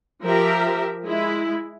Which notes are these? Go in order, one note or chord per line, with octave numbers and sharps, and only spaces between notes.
F3 G4 A#4 E5
G#3 E4